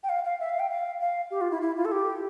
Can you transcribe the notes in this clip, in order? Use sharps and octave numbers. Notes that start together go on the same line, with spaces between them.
G5
F5
F5
E5
F5
G5
F5
F5
G4
F4
E4
E4
F4
A4
G4